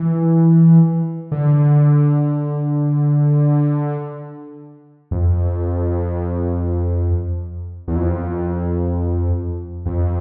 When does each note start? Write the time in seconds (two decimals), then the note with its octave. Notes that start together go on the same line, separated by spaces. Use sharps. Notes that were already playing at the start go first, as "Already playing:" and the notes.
Already playing: E3
1.32 D3
5.11 F2
7.88 E2
7.96 F2
9.86 F2